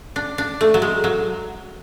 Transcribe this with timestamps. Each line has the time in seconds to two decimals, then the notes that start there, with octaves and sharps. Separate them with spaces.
0.16 D4
0.38 D4
0.61 A3
0.74 F#3
0.82 G#3
1.04 F#3